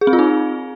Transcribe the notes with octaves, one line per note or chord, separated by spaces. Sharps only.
G#4
C4
F4
D#4